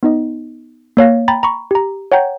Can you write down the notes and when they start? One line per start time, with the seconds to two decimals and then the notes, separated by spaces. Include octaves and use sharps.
0.03 B3 D#4 D#5
0.97 A#3 C#5 F5 A#6
1.28 G5 A#5 B5 A6
1.43 A#5 B5 C#6
1.71 G4 A#5
2.12 C#5 F#5 G5 A#5 G6